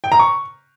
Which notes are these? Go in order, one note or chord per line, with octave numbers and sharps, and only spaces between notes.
G5
A#5
C#6